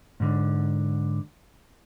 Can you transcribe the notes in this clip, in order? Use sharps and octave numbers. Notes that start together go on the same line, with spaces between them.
G#2 D3